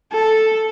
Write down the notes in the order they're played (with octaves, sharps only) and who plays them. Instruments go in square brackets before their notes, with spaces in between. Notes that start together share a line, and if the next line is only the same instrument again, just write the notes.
[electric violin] A4